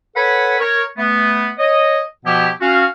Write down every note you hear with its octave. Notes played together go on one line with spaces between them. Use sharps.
A4 B4 C#5 F#5 G#5 B5
A#4 C#5
A3 B3
C#5 D#5
B2 F3 B3 E4 G4
C#4 F#4 F5